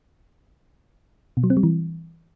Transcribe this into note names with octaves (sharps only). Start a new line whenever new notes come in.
B2
F#3
C4
G3
E3